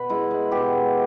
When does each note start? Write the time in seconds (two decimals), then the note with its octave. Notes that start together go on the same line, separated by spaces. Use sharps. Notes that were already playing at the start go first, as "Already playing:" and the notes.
Already playing: B2 B4
0.09 G#3 E4
0.31 G#3
0.52 B2 G4
0.73 G#3